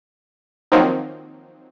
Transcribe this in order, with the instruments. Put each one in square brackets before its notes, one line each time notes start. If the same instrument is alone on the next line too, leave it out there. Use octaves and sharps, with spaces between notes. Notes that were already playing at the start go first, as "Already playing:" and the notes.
[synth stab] D#3 F3 F#3 A#3 C4 D#4